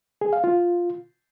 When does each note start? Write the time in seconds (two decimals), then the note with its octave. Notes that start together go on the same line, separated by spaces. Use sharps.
0.21 G#4
0.33 F5
0.44 F4